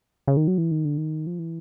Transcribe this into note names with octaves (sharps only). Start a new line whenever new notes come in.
C#3
D#3
F#3
E3
D#3
D3
D#3
F3
E3